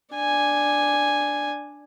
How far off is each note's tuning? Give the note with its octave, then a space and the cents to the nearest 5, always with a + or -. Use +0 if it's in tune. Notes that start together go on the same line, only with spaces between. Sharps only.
D4 +0 G#5 +0